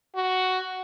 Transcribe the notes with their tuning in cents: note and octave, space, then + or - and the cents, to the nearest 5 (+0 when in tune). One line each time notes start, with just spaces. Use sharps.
F#4 +5